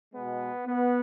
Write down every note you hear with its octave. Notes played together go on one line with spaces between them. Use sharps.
B2 G#3 B3
B3